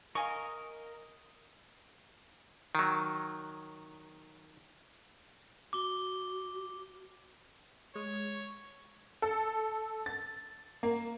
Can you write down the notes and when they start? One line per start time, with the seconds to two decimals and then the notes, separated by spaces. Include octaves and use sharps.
0.15 A#4 D#5 F5 G#5 C#6
2.75 D#3 F#3
5.73 F#4 D6 G7
7.95 G#3 C#5
9.22 A4
10.06 A6
10.83 A#3